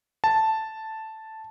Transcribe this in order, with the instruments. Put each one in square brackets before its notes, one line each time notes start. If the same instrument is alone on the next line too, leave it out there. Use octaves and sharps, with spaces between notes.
[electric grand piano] A5